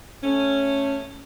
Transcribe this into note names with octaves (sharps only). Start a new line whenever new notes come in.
A3 C#4